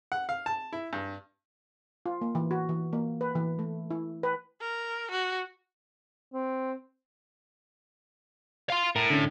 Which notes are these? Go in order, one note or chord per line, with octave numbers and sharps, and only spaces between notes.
F#5
F5
A5
E4
G2
F4
A#3
E3
F#4
E3
A#3
B4
E3
A3
E4
B4
A#4
F#4
C4
F5 C6
A2 A#4
D3 C#4